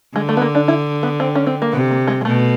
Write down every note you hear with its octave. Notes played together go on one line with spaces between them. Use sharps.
D3 G#3
A3
B3
A#3
D4
E4
B3
C4
C#4
C4
A#3
C3 B3
A#3
G#3
G#3
B2 A3